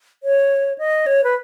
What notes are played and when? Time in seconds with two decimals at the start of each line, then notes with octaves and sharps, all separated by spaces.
0.23 C#5
0.78 D#5
1.06 C#5
1.24 B4